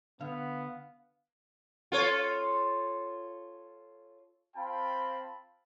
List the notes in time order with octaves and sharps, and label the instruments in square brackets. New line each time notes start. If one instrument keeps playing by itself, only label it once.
[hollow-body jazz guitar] D3 [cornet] B3 [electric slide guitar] F5
[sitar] F4 A4 C#5
[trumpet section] C4 F4 F5 G5 A5 B5